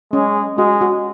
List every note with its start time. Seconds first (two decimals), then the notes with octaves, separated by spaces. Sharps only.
0.13 G#3 C#4
0.58 G#3 F#4
0.81 F#4